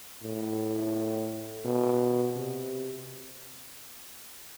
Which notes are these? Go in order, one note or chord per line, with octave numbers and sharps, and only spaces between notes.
A2
B2
C3